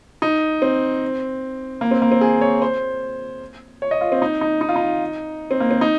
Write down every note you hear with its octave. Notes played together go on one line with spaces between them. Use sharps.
D#4
C4
A#3
C4
A#3
C4
G#4
C#5
C5
C#5
D#5
F4
C4
D#4
D#4
D#4
F4
D#4
C4
A#3
C4
D#4